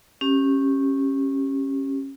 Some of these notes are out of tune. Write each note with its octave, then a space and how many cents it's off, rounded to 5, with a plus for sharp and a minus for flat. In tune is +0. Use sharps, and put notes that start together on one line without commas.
C#4 -20 G4 +0